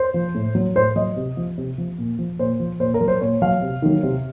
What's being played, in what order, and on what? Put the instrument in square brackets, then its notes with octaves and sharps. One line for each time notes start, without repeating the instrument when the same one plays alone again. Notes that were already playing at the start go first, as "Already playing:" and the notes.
Already playing: [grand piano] C5
F3
A2
F#3
A2 C5
F#3 D#5
C3
F3
C3
F3
A#2
F3
A#2 C5
F3
A#2 C5
A#4
F#3
C5
A#2 C#5
F#3 F5
C3
D#3 F#3
C3